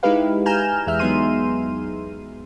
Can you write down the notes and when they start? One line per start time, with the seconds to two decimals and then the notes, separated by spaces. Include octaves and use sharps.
0.03 G#3 D#4 E4 G4 B4 F5
0.46 G#5 A#5 F6 G6 E7
0.86 E2 G#3 E5 F6
0.99 F#3 B3 D#4 G#4 C6 D#7